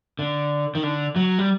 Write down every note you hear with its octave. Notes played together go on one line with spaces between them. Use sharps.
D3
D#3
D3
F#3
G3